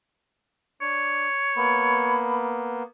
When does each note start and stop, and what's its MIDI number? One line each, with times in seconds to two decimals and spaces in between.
0.81 1.27 62
0.81 2.27 73
1.57 2.83 58
1.57 2.83 59
1.57 2.46 83